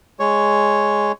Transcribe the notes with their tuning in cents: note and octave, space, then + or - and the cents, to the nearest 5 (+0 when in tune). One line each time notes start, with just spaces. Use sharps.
G#3 +0 C#5 +0